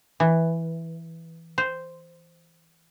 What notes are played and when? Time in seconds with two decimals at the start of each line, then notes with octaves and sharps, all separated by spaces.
0.20 E3
1.58 C5